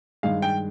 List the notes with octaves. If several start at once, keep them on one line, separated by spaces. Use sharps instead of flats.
G2 D#3 G#3 F5
G5